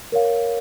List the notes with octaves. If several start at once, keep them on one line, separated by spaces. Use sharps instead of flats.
A#4 C#5 F5